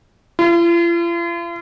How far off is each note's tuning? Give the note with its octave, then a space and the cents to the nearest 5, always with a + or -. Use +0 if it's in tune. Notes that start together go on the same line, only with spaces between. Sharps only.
F4 -45